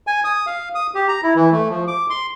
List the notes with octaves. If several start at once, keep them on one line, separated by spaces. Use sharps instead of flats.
G#5
D#6
F5
D#6
G4
A#5
E4
E3
A3
F3
D6
C6